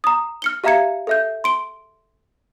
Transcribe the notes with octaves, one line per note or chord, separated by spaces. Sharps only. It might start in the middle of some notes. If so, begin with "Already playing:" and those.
A#5 D#6
F6 C#7 G7
G4 E5 F5 A#5 G#6 C#7
A4 E5 G6
C6 D7 G7